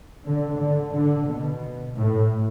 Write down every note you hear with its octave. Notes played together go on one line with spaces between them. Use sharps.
D3
D3
D3
B2
A2